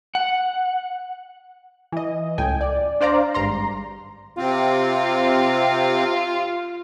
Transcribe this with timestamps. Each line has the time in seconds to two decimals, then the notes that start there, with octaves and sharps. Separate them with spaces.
0.15 F#5
1.92 E3 D#5
2.38 C#2 A2 G5 G#5
2.61 D5
3.01 D4 C5 D5 F5 A#5
3.34 G#1 G2 A#5 C6
4.37 C3 C4 F4